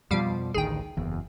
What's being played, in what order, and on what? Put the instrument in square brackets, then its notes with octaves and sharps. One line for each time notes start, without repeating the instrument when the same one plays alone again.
[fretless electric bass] F2 B2 F3 [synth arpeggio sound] G3 F5
[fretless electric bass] A1 D2 D#3 [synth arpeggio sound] G#4 G5
[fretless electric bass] F#1 E2